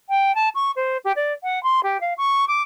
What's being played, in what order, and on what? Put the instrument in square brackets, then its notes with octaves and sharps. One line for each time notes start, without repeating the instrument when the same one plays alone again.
[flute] G5
A5
C#6
C5
G4
D5
F#5
C6
G4
F5
C#6
D6